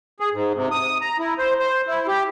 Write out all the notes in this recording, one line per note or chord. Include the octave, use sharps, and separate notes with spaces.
G#4
G#2
C3
D#6
A#5
E4
C5
C5
E4
G4